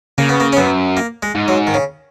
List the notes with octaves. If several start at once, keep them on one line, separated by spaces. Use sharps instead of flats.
C#3 A#3
B3
A#3
C#4
F#2 B3
A#3
G#3
G#2
F#3
D#3
C#3